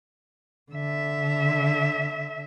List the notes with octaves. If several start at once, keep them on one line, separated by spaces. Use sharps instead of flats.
D3 E5